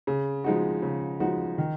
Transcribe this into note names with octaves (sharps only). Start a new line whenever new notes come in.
C#3
F3 G#3 D#4 F#4
C#3
F3 G#3 D#4 F#4
D#3